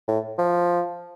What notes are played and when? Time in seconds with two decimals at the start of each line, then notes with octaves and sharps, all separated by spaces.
0.08 A2
0.38 F3